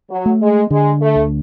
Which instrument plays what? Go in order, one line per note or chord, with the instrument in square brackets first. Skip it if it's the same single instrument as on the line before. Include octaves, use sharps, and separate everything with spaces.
[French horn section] F#3
[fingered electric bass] A3
[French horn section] G#3
[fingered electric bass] D3 [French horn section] G#3
[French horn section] A3
[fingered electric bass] D2